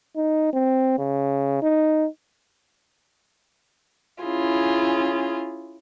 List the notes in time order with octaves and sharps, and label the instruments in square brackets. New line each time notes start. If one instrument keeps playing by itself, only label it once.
[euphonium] D#4
C4
C#3
D#4
[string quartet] C#4 E4 F4 G#4